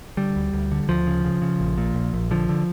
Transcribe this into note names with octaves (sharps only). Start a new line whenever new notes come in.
D3 G3
D2
D2
D3
D2 F3
C#3
C#3
C#3
A#1
A#2
A#1
A#1
D3 F3
D3